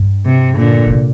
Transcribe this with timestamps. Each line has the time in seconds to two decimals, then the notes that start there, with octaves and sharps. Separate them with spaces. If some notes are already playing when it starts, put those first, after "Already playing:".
Already playing: G2
0.25 C3
0.57 A#2 D3
0.86 A#2
0.90 C3